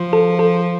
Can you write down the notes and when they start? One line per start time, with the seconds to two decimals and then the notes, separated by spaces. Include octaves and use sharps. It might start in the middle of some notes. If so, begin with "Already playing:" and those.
Already playing: F3
0.13 A4
0.39 A4